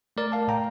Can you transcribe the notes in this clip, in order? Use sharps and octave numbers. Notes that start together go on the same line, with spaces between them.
A3 A#4 D5
F5 A5
A2 G5 A#5